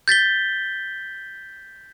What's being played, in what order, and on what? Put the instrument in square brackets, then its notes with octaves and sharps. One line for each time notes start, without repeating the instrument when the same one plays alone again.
[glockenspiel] G6 A6 B6 G7